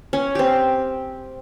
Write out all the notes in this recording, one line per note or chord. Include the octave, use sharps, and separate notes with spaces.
C#4
C4 G4